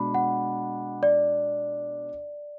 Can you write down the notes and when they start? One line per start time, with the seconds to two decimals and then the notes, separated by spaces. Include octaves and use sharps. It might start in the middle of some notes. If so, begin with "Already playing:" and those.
Already playing: B2 G#3 D4 B5
0.14 F#5
1.03 D5